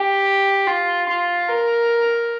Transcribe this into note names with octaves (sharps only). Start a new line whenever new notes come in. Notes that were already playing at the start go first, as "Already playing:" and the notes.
Already playing: G4
F4
F4
A#4